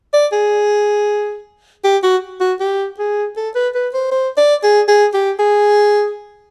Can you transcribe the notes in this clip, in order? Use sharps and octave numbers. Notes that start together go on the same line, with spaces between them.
D5
G#4
G4
F#4
F#4
G4
G#4
A4
B4
B4
C5
C5
D5
G#4
G#4
G4
G#4